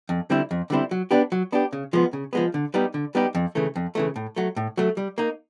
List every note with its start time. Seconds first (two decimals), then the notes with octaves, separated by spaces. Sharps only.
0.09 F2
0.30 D3 G3 C4 E4
0.51 F2
0.70 D3 G3 C4 E4
0.91 F#3
1.11 B3 D4 G4
1.32 F#3
1.52 B3 D4 G4
1.73 C#3
1.93 F3 G#3 B3
2.13 C#3
2.33 F3 G#3 B3
2.54 D3
2.74 G3 B3 D#4 G4
2.94 D3
3.15 G3 B3 D#4 G4
3.35 F2
3.55 C#3 E3 A3
3.76 F2
3.95 C#3 E3 A3
4.16 A2
4.36 F#3 A3
4.56 A2
4.77 F#3 A3
4.97 G3
5.18 A#3 D#4